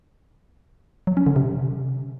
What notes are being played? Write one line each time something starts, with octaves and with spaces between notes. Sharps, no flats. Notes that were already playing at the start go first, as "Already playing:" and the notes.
F#3
C#4
D3
C3